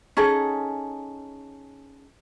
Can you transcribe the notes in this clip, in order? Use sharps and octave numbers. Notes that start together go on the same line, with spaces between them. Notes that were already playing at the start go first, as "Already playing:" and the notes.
C#4 D#4 G#4 A4